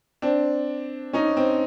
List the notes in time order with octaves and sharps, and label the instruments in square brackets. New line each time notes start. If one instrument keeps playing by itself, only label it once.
[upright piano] C4 D4
C#4 D#4
C4